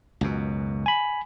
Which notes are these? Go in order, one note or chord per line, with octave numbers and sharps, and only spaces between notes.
C#2 F#2 B2
G#5 B5